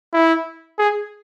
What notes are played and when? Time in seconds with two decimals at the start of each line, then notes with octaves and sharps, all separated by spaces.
0.14 E4
0.78 G#4